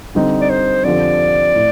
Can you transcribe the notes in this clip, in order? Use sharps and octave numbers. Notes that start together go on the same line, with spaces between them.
D3 G3 C4 D#4 G4
D5
C5
F2 D3 F3 C4 G4 D5
A2